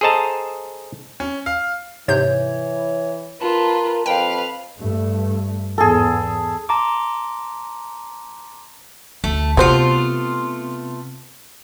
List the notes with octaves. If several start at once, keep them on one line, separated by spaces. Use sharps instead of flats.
G#4 A4 C5 D#5 A5 A#5
C#4
F5
G#2 C3 E3 C#5 G6
F4 A#4 B4 A5
F2 B4 F5 G5
G2 A3
E2 G#2 B3 G#4 A4
A5 A#5 C6 D6
D2 A3
C3 G3 A3 B3 F4 F#4 C5